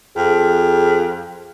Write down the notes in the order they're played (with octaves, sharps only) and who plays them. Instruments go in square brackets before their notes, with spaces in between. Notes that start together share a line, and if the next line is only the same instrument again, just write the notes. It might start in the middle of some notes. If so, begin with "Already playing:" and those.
[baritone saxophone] F2 [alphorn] G#4